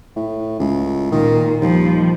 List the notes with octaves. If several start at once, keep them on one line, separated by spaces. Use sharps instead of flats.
A2
C#2
A#2 D#3
D#2 F3 G3